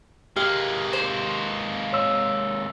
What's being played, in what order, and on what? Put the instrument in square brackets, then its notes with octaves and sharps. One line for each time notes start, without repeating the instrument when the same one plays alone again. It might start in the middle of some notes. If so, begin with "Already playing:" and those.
[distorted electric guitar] G#3 A#3 [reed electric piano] G4 [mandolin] F5
[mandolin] C5
[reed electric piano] C#5 C6 E6